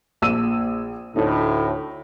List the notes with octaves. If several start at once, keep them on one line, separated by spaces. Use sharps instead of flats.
A#1 E6 D#7
D2 A2 D#4